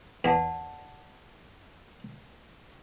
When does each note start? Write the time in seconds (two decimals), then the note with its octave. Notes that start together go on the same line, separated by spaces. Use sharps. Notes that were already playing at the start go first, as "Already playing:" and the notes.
0.24 E2 D5 F#5 A5